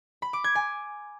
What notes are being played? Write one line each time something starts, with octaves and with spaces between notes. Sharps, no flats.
B5
D6
G#6
G#5